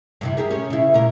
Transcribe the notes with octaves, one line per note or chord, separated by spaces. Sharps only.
G2 C3 E3
G4 G#4 A#4
C#4
C#3 E4
A#2 A#4